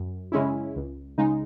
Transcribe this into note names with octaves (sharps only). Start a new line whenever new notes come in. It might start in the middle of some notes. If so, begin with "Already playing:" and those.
Already playing: F#2
C#3 G#3 C#4 E4
C#2
C#3 G#3 D#4